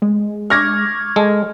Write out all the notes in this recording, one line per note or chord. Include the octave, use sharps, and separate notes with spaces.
G#3
C#6 D6 F6 G#6 A#6
G#3 A4